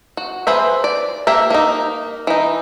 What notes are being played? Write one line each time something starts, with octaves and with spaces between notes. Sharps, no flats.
F#4
G#4 B4 C5 E5
D5
A#3 G4 E5
A#3 D#4
E3 D#4